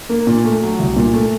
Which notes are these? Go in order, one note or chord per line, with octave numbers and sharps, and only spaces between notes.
A#3
A#2
A3
F#3
C2
A#2
A3